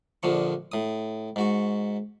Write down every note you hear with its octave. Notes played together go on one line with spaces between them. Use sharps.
A#1 D3 F3 C#6
A2 D#6
G#2 F#4 C#6